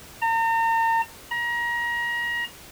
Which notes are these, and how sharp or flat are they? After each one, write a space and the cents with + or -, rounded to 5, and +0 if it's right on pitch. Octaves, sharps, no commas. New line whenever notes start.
A#5 -40
A#5 +30